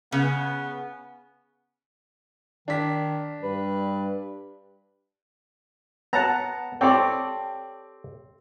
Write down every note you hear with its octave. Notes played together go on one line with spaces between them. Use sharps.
C#3 B3
D#3 D4 B6
G2 B4
B3 F#5 A5 A#5
C4 G4 A4 C#5 D5